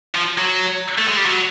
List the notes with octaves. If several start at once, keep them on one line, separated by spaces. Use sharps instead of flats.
F3
F#3
A3
G#3
G3
F#3